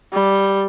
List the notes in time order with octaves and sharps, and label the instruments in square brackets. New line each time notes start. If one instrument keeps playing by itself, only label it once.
[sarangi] G3